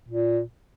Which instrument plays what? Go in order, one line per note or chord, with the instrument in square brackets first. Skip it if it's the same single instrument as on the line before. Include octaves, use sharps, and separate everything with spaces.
[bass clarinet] A#2